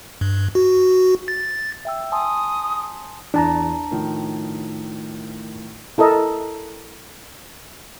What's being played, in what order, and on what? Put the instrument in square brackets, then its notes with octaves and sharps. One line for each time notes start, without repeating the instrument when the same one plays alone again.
[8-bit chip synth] G2
F#4
A6
[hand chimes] E5 G5 E6
[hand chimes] G#5 A5 C6 [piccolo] D#6
[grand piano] E2 [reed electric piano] D4 A5 A#5
[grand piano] A2 D#3 F3
[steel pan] E4 A4 A#4 D#5